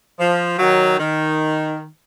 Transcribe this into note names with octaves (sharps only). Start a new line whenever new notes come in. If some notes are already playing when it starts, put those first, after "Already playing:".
F3
D#3 F#3
D#3